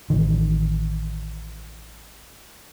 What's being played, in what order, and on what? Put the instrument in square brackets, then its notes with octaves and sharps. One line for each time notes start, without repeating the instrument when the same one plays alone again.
[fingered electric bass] A1 D#3